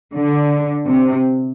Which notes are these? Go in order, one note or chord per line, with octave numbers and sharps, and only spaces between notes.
D3
C3